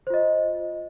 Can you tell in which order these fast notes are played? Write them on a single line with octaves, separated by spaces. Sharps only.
C5 F4 D#5